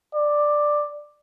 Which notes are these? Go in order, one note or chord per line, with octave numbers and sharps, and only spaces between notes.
D5